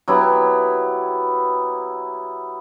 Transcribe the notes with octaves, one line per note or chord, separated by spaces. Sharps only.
F#3 B3 E4 G4